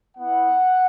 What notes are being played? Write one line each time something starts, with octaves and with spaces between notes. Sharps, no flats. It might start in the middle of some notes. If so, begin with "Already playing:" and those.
B3 E4 F#5